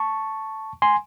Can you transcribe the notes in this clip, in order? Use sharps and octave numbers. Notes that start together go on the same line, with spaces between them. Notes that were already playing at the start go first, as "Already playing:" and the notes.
Already playing: A5 C#6
G#5 C6